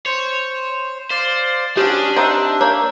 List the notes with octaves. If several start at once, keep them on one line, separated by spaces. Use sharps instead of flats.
C5 C#5
C5 D5 F5
C#4 D4 F#4 G4 C5 D#6
C4 D#4 E5 F#5
A#3 C#5 G6